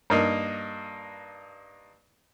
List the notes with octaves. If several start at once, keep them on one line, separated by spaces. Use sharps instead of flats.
G2 A#3 D#4